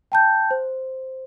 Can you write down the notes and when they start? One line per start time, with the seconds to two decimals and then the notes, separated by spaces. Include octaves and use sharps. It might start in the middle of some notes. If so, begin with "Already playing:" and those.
0.12 G5 A5 G6
0.51 C5